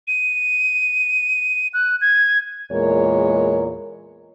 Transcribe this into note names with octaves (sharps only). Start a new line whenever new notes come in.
D#7
F#6
G#6
E2 A#2 G#3 A#4 C#5